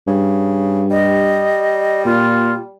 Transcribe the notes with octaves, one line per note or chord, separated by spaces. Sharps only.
G2 C#3
G3 D#5
A#2 F4